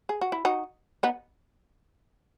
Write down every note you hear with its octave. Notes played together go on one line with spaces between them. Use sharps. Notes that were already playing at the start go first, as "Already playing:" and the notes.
G#4
F#4
E4
D#4 F#4
B3 D#4